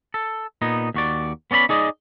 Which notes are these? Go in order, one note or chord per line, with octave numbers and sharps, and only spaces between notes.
A4
A#2 B3 D#4
D#2 F#4 D5
B3 C#4 D5 D#5 B5
D#4 G#4 D5 D#5